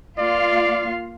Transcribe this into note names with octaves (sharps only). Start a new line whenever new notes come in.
A#3 F4 D5 F5